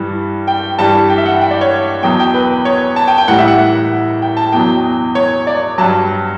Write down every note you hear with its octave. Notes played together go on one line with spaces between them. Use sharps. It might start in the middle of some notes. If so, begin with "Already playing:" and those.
Already playing: G2 E3 G3
G5
G2 E3 G3 A5
G5
E5
F#5
G5
D5
C#5
E2 B2 F#3 G5
G5
B4
C#5
A5
G5
G5
A2 E3 G3 F#5
E5
F#5
F#5
G5
A5
E2 B2 F#3 G5
C#5
D5
G2 F#3 A5